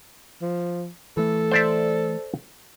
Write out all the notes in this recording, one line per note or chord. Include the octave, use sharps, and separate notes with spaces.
F3
E3 A3 A4
C5 D5 E5